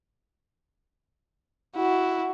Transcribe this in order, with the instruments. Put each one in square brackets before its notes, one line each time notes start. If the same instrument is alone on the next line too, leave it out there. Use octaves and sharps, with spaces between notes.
[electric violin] E4 [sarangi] F#4